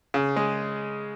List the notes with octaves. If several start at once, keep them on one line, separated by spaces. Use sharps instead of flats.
C#3
G#3